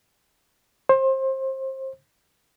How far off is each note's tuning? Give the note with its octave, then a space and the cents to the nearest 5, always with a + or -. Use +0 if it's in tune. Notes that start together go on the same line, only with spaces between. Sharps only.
C5 +25